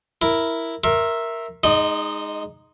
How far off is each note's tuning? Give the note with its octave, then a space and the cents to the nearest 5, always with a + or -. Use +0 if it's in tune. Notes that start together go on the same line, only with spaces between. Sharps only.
E4 +0 A#4 +0
A#4 +0 E5 +0 C6 +35
G#3 +0 D#4 +0 D#5 -40